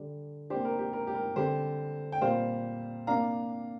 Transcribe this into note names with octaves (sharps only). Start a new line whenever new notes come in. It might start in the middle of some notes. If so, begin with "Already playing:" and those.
Already playing: D3 G3 D4
C3 A#3 D4 G4 C5
A#4
G4
A#4
G4
A#4
D3 G3 C4 G4 C5
G5
A#2 G3 C4 C5 F5
C3 A#3 D4 F5 A#5